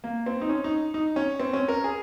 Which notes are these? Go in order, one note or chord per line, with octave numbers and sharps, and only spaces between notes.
A#3
C4
D#4
C#4
D#4
D#4
C#4
C4
C#4
A#4
G#4